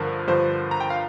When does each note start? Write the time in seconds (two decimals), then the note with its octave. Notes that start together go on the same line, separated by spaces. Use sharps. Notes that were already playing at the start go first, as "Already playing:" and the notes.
Already playing: G2 D3 F3 A#4
0.27 G2 D3 F3 C5
0.71 A#5
0.80 G5
0.90 F5